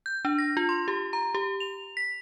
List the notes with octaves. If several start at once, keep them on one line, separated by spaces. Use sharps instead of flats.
G6
D4
A#6
F4
C6
G4
A#5
G4
F7
B6